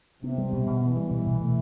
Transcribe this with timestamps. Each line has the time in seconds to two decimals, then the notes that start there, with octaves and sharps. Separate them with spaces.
0.23 C3 B3
0.38 G3
0.53 B2
0.66 B2
0.82 E3 B3
0.96 G3
1.11 B2
1.27 B2
1.41 A3